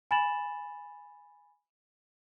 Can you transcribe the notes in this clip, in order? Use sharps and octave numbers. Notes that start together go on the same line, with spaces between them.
G#5 B5 A6 E7 F#7